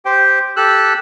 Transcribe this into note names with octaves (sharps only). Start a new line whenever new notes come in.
G4 C5 G5
G4 A4 E6 F#6